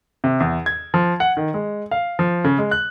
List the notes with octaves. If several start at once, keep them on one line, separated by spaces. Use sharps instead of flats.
C3
E2
G#6
F3
F#5
D#3
G#3
F5
F3
C#3
G#3
F#6